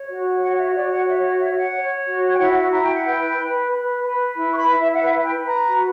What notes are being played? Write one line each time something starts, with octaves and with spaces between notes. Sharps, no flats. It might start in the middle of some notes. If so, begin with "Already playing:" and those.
Already playing: C#5
F#4
C#5 F#5
E5
F#4 D5
F#5
C#5 E5
C#5 E5
F#5
C#5
F#4
G5
E4 F#5
E4 A#5
G5
F#5
B4 G5
B4
B4
B4
E4
C#6
B5
E4
E5
F#5
B4 E5
G5
B4
A#5
F#4